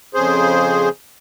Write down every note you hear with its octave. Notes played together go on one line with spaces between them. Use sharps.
F2 C#3 G#4 C5